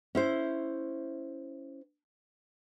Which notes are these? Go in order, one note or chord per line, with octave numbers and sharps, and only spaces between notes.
C#4 E4 C5